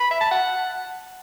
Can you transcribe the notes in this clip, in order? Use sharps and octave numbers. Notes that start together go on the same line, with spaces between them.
B5
E5
A5
F#5